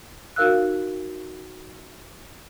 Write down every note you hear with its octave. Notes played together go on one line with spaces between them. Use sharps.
D#4 F#4 A#4 F5 E6 F#6